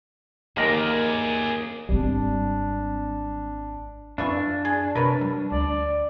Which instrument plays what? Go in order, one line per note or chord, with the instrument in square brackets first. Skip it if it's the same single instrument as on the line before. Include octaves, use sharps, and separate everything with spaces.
[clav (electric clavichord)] D#2 A#4 A#5 [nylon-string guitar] A#3 [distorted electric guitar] G#4 D5
[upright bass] G#1 C4 [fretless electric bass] G3 [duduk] D4
[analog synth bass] F#2 [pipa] E3 F4 C#6 [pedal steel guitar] D4
[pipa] G#4
[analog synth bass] C3 [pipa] A#4 B4 C#5
[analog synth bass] G3
[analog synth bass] D2 [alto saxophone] D5